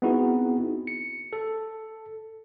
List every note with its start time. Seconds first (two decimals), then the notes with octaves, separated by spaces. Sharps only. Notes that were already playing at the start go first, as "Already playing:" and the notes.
0.02 B3 C4 D#4 E4 F#4 G#4
0.87 C#7
1.33 A4